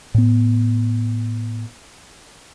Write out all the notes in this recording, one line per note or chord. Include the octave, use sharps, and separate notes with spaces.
A2 B3